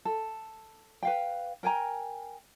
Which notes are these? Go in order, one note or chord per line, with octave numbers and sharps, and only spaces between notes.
A4
B4 F5 G5
A#4 G5 G#5 A#5